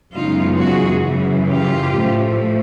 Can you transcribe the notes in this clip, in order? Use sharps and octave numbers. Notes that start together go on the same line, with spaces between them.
F#2 C#3 E3 G#3 B3 D#4 F4
F#4 G#4
F#2 C#3 E3
F4 G4
A2 F3 A3